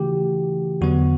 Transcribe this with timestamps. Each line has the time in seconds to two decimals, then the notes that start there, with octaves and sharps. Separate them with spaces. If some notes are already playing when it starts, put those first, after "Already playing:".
Already playing: C#3 E3 A3 F#4 G4
0.81 E2 D3 F#3 B3 F#4